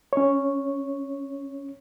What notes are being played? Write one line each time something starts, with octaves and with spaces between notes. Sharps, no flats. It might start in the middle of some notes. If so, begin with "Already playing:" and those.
C#4 C#5